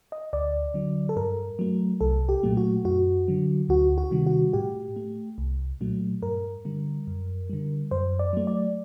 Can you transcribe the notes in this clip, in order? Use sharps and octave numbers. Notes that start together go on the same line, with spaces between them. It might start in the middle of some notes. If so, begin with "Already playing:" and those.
D#5
D2 D5
D3 F#3
A4
G2 A#4
F#3 A3
C2 A4
G4
A#2 F#3 A3
F#4
F#2 F#4
D3 F#3
D2 F#4
F#4
C3 D#3 G3
F#4
A2 G4
A3
C2
A#2 F#3 A3
G2 A#4
D3 G3
F#2
D3 G3
F#2 C5
D5
F#3 A3
D5